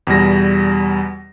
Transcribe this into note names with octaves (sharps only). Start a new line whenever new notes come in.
E2 B2 G3 A#6